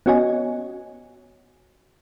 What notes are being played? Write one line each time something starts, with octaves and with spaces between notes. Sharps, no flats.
B3 C#4 F#4 C#5 D#5 G#5